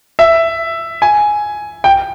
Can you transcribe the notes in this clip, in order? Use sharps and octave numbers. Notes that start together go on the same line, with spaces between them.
E5
G#5
G5